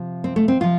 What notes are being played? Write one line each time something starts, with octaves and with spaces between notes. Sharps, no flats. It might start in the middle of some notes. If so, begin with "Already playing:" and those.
Already playing: C3 F3
C4
A3
C4
C3 F3 F4